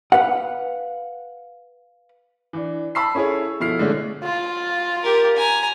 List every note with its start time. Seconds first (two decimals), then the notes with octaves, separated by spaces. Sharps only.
0.12 B4 F5 F#5
2.53 E3 D4
2.95 A5 B5 E6 C7
3.15 C#4 E4 G#4 A4 C#5
3.60 B2 F3 E4 A4 F6 C7
3.79 D3 G#3 A3 C#4
4.23 F4
5.03 G4 A#4
5.36 G#5 A#5